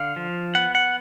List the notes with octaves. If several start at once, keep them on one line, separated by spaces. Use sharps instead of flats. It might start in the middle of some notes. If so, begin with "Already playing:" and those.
Already playing: D3 F5
F3
B3 F#5
F#5